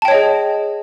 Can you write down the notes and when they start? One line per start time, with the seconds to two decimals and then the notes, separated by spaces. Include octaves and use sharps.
0.02 A5
0.05 G5
0.08 C#5
0.11 D#5
0.14 G#4